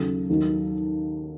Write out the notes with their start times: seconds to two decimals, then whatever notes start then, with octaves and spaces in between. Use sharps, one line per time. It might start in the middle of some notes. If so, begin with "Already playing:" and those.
Already playing: D#2 C#3 F#3 A4
0.29 D#2 D#3 F#3